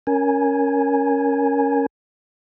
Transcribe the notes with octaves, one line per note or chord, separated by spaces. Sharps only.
C#4 A#4 G#5